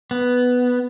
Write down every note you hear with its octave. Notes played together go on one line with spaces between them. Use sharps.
B3